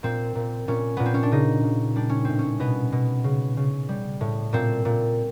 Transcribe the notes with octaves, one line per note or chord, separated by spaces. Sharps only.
A#2 C4
A#2
A#2 C#4
A#2 B3
C4
C#4
D4
C#3 D#4
C#3
G3 D4
C#4
A2 C4
C#4
B2 B3
B2
C#3
C#3
G3
A2
A#2 C4
A#2